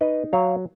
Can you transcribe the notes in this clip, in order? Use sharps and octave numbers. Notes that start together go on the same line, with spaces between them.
D#4 B4 D#5
F#3 C#5 F5